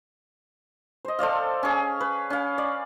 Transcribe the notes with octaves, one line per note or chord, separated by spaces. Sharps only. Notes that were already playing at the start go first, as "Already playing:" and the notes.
C5 D#5
A4 C5 D5 F5
C#4 G#4
B4
C#4 F5
D5